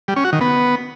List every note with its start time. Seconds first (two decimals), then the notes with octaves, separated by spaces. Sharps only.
0.08 G3
0.16 C#4
0.25 F#4
0.33 D#3
0.41 B3